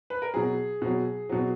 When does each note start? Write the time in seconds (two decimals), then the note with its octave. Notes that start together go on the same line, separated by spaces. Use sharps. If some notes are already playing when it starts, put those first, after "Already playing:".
0.10 B4
0.22 A#4
0.34 B2 F#3 G#4
0.82 B2 F#3
1.29 B2 F#3